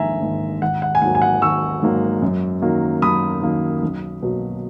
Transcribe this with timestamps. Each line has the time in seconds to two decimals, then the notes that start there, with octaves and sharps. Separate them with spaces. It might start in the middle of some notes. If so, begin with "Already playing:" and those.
Already playing: A#1 G#2 D#3 A#3 E5 G#5 A#5
0.22 G#2 D#3 A#3
0.62 G#1 F#5
0.82 F#5
0.95 G#5
1.02 G#2 F#3 A#3 F#5
1.15 G#5
1.22 F#5
1.42 G#1 C#6 E6
1.82 G#2 F#3 A#3
2.22 F#2
2.62 D#3 F#3 A#3
3.02 F#2 B5 D#6
3.42 D#3 F#3 A#3
3.82 B1
4.23 B2 F#3 A#3